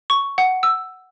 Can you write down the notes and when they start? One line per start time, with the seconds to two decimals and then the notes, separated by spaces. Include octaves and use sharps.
0.10 C#6
0.38 F#5
0.63 E6